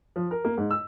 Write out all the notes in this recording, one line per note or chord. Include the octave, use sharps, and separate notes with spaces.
F3
A#4
A#3
G#2
E6